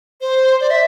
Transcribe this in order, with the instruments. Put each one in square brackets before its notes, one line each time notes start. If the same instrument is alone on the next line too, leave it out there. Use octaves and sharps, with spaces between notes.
[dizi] C5
D5
E5